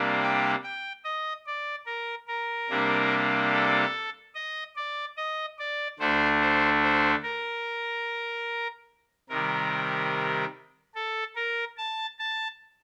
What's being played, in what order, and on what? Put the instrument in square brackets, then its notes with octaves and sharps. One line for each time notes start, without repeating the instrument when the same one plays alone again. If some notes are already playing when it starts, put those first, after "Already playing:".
Already playing: [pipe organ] C3 G3 A#3 D4
G5
G5
D#5
D5
A#4
A#4
C3 G3 A#3 D4
A4
D#5
D5
D#5
D5
D2 D3 A3 D4 C5
C5
C5
A#4
C3 D#3 G3 A#4
A4
A#4
A5
A5